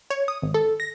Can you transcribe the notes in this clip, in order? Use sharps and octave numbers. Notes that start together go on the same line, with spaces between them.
C#5
D#6
G#1
A4
A#6